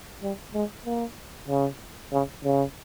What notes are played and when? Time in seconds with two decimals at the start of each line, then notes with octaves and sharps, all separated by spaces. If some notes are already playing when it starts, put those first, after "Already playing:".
0.22 G3
0.54 G#3
0.86 A#3
1.48 C#3
2.13 C#3
2.44 C#3